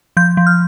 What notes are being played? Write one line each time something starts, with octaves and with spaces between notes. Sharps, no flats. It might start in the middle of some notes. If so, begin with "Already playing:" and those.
F3 G6
F3
F6